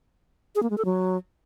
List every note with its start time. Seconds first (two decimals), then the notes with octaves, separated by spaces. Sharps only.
0.55 G#4
0.63 A#3
0.70 G#3
0.78 A4
0.85 F#3